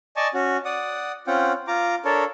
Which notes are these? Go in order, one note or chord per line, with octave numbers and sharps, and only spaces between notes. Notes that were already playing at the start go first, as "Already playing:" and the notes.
D5 D#5 G#5 A5 C#6
C#4 F#4
D5 F#5 D#6
C4 C#4 F4 F#5 G5
F4 A#5 D6
D4 A4 A#4 C#5